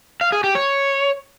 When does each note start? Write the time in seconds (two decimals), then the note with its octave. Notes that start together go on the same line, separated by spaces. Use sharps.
0.21 F5
0.32 G#4
0.44 G4
0.55 C#5